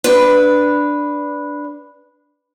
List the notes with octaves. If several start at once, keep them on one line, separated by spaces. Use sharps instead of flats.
D4 B4